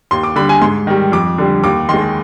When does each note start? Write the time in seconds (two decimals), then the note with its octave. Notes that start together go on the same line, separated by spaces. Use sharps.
0.11 D#2 C6
0.23 D6
0.36 D3 G3 B5
0.49 G#5
0.62 G#2 C6
0.87 D#3 G3
1.12 F2 D6
1.38 D3 G3
1.64 D#2 D6
1.89 D#3 G#3 C6